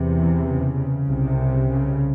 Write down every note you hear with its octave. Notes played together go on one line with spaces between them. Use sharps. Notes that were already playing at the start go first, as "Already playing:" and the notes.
Already playing: E2 C3
E3
C#3
C2 C3
C#3